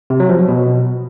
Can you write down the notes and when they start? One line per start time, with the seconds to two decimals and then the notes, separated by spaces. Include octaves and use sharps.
0.10 C3
0.20 F#3
0.29 F3
0.39 F#3
0.48 B2